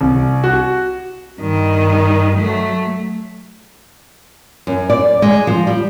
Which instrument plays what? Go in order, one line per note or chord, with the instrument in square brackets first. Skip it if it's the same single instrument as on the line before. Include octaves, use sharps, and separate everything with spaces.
[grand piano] C2
F#4
[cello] G2 D#3
F#3 A3
[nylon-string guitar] F#2
D5
G#3
F3
G3